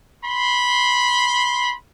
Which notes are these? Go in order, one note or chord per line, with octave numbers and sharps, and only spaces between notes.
B5 C6